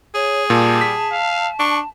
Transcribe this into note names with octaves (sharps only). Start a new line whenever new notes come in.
G#4 C#5
A#2 G3 A5
B6
F5
D4 C#6